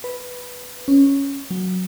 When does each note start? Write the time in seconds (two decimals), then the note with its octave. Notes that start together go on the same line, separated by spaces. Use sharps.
0.04 B4
0.88 C#4
1.51 F#3